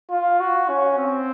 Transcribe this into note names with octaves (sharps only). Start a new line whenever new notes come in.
F4
F#4
C#4
C4